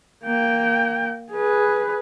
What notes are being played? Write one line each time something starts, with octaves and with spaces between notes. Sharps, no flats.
A#3 G5
G#4 B4